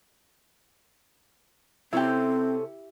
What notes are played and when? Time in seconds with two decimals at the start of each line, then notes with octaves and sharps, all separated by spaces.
1.93 C3 C4 C#4 E4 G4 A4